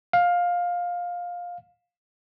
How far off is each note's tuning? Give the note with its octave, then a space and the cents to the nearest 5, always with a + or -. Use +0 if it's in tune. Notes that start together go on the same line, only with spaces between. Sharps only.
F5 +15